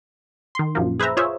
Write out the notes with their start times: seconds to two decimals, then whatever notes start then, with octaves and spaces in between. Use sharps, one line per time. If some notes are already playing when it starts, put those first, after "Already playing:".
0.55 D#3 C6
0.75 A#1 F#2 F3 A#3
1.00 G#4 B4 C5 E5 A#5
1.17 F4 G#4 C5 C#5 E5